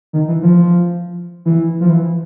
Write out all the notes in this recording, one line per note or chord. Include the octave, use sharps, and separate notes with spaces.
D#3
E3
F3
E3
F3
E3